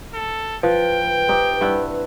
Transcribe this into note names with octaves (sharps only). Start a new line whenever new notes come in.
A4
F3 B4 G5
C4 D#4 G4
G2 E4 F#5